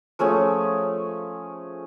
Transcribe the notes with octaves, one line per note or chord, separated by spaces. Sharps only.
F3 A3 C#4 G#4